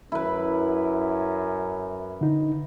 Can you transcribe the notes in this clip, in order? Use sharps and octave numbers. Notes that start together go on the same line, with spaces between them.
F#2 E4 B4
D3 D#4